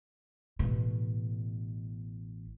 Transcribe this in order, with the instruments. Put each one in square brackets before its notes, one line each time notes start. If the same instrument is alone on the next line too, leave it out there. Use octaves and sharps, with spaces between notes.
[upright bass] A1 B2